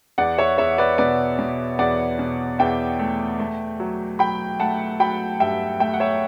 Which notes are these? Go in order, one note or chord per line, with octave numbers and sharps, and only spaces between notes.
E2 D5 F#5
C#5 E5
E2 C#5 E5
B4 D5
B2 B4 D5
B2
E2 D5 F#5
B2
E2 E5 G5
A3
A3
F#3
F#3 G5 B5
A3 F#5 A5
F#3 G5 B5
G2 E5 G5
A3 E5 G5
F#5
C#5 E5